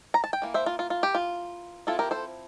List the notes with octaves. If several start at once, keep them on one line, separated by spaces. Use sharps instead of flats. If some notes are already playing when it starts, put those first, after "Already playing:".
A#5
A5
G5
E3 A#3
C5 E5
F4
F4
F4
G4
F4
F3 C4 E4 F4 A4
G4 A#4
A4 C5